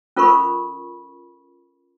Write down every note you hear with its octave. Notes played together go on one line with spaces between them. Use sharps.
C#4 F4 A4 A#4 B5 C#6